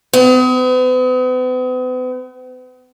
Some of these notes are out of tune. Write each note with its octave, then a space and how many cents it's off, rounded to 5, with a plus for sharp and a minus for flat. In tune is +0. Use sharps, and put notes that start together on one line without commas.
B3 +45